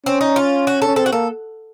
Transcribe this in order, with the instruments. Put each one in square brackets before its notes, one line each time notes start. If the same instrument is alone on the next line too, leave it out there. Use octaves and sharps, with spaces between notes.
[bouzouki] C4 [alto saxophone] C#4
[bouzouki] D#4
F4
F#4
A4
[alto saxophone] C#4
[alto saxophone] C4 [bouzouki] A4
[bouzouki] F#4
[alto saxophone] A#3 [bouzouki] A4